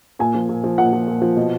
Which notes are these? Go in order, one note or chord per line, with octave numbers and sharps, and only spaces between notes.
A#2 G#5
F3
A#2
F3
A#2 F#5
F3
A#2
F3
B2